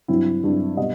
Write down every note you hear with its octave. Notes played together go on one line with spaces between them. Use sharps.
G2 F#3 C4 E4
G2 F#3 C4
B2 G3 D#5